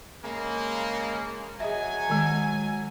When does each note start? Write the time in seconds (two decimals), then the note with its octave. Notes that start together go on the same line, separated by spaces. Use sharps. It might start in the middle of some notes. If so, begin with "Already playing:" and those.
0.24 C#3 G#3 A#3
1.60 F#3 G#4 D#5 E5 G#5
2.10 D#3 G#3